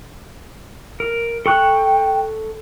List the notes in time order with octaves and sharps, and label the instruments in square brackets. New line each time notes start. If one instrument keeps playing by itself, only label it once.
[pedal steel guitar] A#4
[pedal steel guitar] A4 C#6 F#6 [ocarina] G5